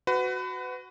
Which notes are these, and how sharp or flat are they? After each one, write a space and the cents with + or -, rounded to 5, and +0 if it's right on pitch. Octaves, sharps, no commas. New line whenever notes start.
F#4 +0 B4 +30